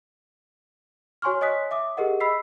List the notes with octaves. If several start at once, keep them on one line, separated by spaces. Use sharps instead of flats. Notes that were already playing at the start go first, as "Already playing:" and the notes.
F#4 C#5 G#5 C6 C#6 F6
C#5 D#5 G#5 D#6 F#6 B6
E5 D6 D#6
G4 G#4 A#4 D#5 F#5
D#5 B5 E6 B6 C7